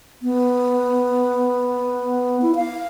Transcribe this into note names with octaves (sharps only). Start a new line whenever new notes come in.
B3
E4
F5